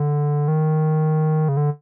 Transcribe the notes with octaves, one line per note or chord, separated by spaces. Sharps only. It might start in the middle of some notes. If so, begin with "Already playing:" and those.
Already playing: D3
D#3
C#3
D3